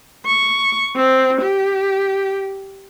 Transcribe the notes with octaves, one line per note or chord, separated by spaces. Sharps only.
C#6
C4
G4